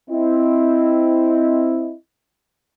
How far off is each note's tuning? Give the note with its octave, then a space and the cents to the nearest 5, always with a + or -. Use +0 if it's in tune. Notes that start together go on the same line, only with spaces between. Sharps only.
C4 +0 E4 +0 D#5 +0